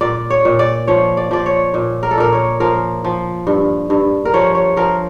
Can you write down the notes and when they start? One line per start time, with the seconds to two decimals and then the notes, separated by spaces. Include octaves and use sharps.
0.01 A#2 D5
0.30 C#5
0.45 A#2
0.59 D5
0.87 F3 C#5
1.17 D5
1.31 F3 D5
1.46 C#5
1.74 A#2
2.03 A#4
2.11 A4
2.18 A#2 A#4
2.32 C#5
2.60 F3 A#4
3.04 F3
3.47 G2
3.90 G2
4.25 A#4
4.34 F3 C#5
4.55 C#5
4.77 F3 A#4